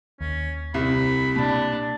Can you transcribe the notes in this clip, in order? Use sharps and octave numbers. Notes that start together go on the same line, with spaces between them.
D#2 C#4
C2 B5
B2 A#3 D4